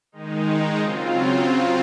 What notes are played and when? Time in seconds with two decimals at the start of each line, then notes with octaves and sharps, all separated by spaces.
0.12 D#3 G#3 D#4
0.77 C#3 F#3 C4 F4